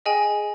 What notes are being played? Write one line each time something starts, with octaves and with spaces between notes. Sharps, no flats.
G#4 D#5 G5 G#5